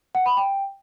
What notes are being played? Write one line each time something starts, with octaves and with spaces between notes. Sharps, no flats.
F#5
B5
G5